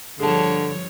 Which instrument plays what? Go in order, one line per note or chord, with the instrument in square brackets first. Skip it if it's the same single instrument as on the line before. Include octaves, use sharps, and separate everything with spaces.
[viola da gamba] G2 F3 C#5 [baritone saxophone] D3 [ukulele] G#4 A5